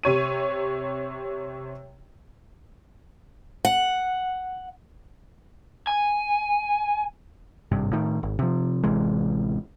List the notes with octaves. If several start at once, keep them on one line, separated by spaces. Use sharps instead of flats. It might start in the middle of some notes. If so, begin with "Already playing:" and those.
C3 C#5 D#7
F#5
G#5
G#1 G2 C3
A2 D#3
G#1
C3 F3
A1 C3 E3 G#3